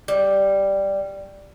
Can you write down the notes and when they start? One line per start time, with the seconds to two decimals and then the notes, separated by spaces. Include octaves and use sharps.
0.08 G3